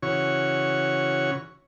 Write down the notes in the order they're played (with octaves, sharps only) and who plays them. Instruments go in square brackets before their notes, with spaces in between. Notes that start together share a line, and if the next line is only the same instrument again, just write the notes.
[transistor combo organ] C#3 E3 F#4 C#5 C#6